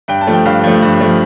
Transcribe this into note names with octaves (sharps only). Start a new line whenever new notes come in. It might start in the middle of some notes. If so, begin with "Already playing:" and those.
G2 G5
A5
F3 A3
G5
G2 F5
F3 A3
G2
F3 A3